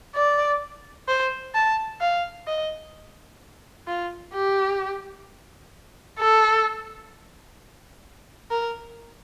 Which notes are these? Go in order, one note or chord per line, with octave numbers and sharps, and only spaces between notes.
D5
C5
A5
F5
D#5
F4
G4
A4
A#4